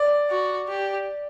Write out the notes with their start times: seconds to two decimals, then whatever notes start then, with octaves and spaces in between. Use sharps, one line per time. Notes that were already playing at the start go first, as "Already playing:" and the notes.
Already playing: D5
0.30 F#4
0.69 G4